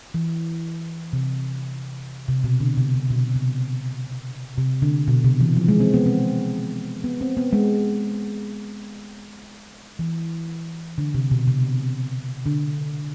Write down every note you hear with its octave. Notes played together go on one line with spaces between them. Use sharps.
E3
C3
C3
B2
D3
C3
C3
B2
C3
C3
D3
B2
C3
E3
F3
G#3
C4
B3
C4
B3
C4
B3
G#3
E3
D3
C3
B2
C3
D3